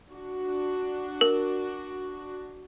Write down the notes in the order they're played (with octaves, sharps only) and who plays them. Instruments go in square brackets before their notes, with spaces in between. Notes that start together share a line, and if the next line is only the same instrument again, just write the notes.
[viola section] D4 F#4
[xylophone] A#4